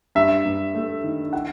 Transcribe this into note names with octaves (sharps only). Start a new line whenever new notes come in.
G2 E5
G2
A3
D#3
E4 F#5